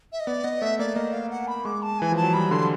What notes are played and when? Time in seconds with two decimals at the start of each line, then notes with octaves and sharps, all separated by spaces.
0.12 E5
0.20 D#5
0.27 B3 D5
0.44 B3 D#5
0.62 A3 E5
0.79 A#3 D5
0.96 A#3 D#5
1.13 F5
1.31 F#5
1.48 B5
1.65 G#3 D6
1.82 A5
1.99 E3 G#5
2.12 F3 A5
2.23 F#3
2.34 G3 B5
2.51 D3 C6